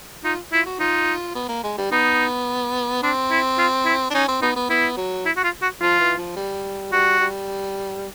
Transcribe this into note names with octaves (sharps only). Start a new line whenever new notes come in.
D#4 F4
E4 F4
F#4
D#4 F4
B3
A#3
G#3
G3
B3 D#4
C4 D4
E4
F4
E4
D4
C#4 D#4
C4
B3 D#4
B3
B3 E4
F#3
E4
F#4
F4
F#4
F3 F4
E3
F3
G3
G3 F#4
G3